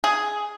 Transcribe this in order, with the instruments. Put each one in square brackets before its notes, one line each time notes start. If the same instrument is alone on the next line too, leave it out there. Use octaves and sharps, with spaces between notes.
[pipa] G#4